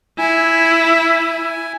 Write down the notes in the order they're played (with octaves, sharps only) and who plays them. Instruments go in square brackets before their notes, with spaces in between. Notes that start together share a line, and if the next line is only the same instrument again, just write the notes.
[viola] E4 [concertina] G#5